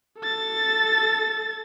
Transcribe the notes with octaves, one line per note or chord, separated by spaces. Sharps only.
A4 A6